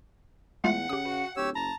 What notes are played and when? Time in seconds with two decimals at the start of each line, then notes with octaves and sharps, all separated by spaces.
0.64 E2 G#3 A3 F4 F#5
0.89 C#3 G4 D#6
1.05 F#4 B4
1.37 D1 G4 C#5 E6
1.55 F#1 A5 A#5